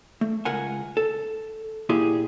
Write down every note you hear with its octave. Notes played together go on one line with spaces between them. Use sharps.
A3
C#2 A#4 F#5 G#5
A4
A#2 E4 G4 G#4